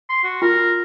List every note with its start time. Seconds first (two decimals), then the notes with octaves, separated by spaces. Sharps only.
0.09 C6
0.24 F#4
0.42 F4 A#4